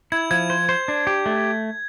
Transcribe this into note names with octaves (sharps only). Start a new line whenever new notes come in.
E4 G#6
F3 G#6
C5
C5
D4
G4
A3